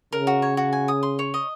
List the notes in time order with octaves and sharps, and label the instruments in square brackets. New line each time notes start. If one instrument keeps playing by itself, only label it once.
[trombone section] C#3 [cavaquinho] A#4
[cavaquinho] F#4
C#5
F#4
G#5
D#6
C6
C#5
D#5